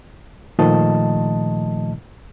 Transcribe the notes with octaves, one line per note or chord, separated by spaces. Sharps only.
A#2 D#3 F3 A3 D#5 A5